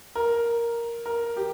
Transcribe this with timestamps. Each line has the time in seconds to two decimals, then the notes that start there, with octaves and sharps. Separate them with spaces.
0.16 A#4
1.06 A#4
1.37 G4